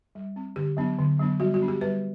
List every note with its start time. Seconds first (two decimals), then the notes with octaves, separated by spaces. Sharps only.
0.15 G3
0.36 C4
0.56 D3 G4
0.77 F#3 B3 D4
0.99 D3
1.19 F#3 B3 D4
1.40 G3 F#4
1.54 F#4
1.61 B3 D4
1.68 G4
1.81 G3 B4